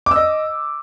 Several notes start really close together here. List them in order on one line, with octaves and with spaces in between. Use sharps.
D6 E6 D#5